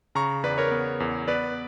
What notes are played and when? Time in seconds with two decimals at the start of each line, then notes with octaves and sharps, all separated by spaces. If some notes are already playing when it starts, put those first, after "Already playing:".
0.15 C#3 A#5 C#6
0.43 E2 B4 D5
0.58 A#4 C#5
0.71 B3
1.00 E2
1.28 B3 B4 D5